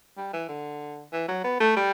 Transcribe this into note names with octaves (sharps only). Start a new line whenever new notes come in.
G3
E3
D3
E3
F#3
B3
A3
G3